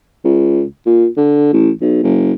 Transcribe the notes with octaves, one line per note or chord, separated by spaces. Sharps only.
C#2
A#2
D3
A1
B1
F#1